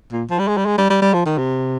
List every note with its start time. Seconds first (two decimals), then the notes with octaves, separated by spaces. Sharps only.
0.12 A#2
0.30 F3
0.39 G3
0.48 G#3
0.57 G3
0.66 G#3
0.78 G3
0.90 G3
1.02 G3
1.14 F3
1.26 D#3
1.38 C3